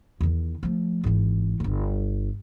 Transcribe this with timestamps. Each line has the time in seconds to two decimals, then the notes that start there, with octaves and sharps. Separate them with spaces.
0.21 E2 D#3
0.63 F3 A3
1.04 G#1 E3
1.60 D1 G1